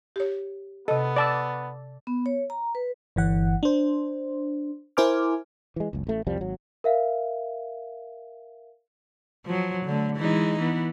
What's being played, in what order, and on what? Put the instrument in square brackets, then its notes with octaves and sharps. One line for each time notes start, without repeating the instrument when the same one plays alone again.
[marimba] G4 C#5
[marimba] C3 D#5 [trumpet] B3 [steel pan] A4
[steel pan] D5 A5 E6
[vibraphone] B3
C#5
A#5
B4
[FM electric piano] G1 E3 F#5
D4 C5
E4 A#4 C5 G#5 D6 F6
[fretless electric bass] E3 G#3
F#1 C#2
A1 A3
C2 F2 F3 G3
G#1 F#3
[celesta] A#4 E5 F5
[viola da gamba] F3 F#3
D3 A3
E3 G#3 D#4
E3 B3